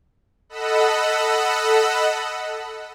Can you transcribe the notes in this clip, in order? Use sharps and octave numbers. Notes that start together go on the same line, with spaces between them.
A4 D#5 F#5 B5 E6 F#6